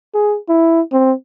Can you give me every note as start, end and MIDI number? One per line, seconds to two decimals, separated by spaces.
0.14 0.37 68
0.49 0.81 64
0.92 1.13 60